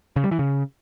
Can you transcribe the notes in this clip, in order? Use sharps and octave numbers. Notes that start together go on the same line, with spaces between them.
C#3
G3
E3
C#3